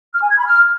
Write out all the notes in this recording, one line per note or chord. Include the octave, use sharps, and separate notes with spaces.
F6
G#5
G#6
B5
F6